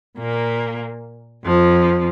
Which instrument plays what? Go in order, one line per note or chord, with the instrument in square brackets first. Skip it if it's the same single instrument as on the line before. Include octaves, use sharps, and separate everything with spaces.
[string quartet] A#2 A#3
F2 F3